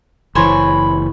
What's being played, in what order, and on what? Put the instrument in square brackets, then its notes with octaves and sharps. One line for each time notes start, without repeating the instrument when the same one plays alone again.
[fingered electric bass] F#1 E3 [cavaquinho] C5 C#5 G#5 [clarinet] B5